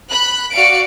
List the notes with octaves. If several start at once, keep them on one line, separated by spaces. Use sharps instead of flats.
B5 F#6
F#4 D5 F5 C#7 D7